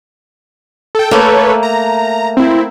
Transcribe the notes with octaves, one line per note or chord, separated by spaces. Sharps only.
A4 G5
A3 A#3 A4 B4 C#5
A#5
C4 E4